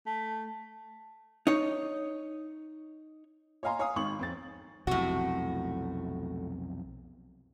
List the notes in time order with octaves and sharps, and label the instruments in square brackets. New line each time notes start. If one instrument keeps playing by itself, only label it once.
[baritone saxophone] A3
[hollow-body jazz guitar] D#4 C#5
[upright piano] C#5 D#5 F5 G#5 A#5 C6
C#5 F5 G#5 D#6
G#1 D#3 C#6 F#7
F2 C4 A6
[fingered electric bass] B1 F2 C3 [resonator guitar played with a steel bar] A2 F#4